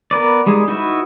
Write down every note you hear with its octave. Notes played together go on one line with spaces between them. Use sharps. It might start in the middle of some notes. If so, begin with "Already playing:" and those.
B3 A#4 B4 D5
G3 G#3 D#4 G#4
D#4 E4 F#4 B4 E5